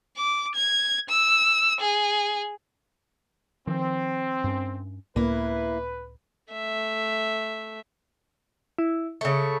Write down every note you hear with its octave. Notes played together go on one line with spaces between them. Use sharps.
D6
G#6
E6
G#4
D#3 F3 C4
G2 C#4
C#2 A2 A#3 E4 B4
A3 E5
E4
C#3 A3 C#6